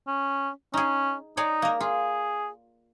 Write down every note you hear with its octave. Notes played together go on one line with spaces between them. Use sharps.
C#4
C#4 D#4 G#4
D#4 G#4 C#5 D5
A#3 A#4
F4 G#4